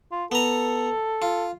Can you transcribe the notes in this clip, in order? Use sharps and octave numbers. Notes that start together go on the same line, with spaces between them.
F4
B3 A4 A#5
F4